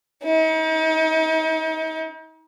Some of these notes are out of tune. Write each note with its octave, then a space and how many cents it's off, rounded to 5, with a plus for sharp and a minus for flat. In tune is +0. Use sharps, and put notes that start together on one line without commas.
D#4 +40